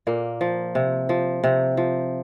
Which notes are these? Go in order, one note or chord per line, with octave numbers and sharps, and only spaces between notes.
A#2 A#3
F3
C3
F3
C3
F3